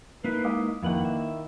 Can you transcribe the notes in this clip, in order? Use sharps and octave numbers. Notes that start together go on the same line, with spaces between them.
A#3 D#4 E4 B4
G#3 F5 D6 D#6
F2 D#3 A#3 E4 B4 F#5
E5